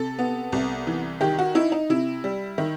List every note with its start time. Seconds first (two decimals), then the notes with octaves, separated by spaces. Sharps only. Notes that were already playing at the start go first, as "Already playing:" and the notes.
Already playing: C3 A4
0.19 B3
0.52 C2
0.87 E3
1.21 D#3 G4
1.39 F#4
1.55 D#4 E4
1.72 D#4
1.90 C3 E4
2.24 G3
2.58 D#3